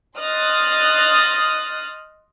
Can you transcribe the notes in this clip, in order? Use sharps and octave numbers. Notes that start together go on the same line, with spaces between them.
D#5 C6 D#6 F6 F#6 A6